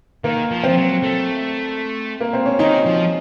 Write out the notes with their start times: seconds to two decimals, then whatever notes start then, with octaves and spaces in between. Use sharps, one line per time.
0.24 D#3 A#3
0.51 F3
0.64 F3 C4
0.77 F#3
1.03 A3
2.20 A#3
2.33 C4
2.46 C#4
2.59 D#3 D#4
2.85 F3